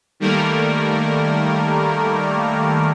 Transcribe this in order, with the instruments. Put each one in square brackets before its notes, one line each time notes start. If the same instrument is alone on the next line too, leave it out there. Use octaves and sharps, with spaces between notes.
[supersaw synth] D#3 G3 A3 A#3 A#4